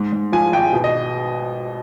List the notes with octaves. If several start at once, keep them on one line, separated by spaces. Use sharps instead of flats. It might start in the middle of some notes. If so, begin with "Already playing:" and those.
Already playing: G#2
G#2
F3 G#5
G#1 G5
B2
D#5